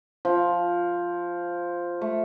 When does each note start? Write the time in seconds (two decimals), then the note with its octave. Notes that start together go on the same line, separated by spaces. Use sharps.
0.25 F3
2.01 A3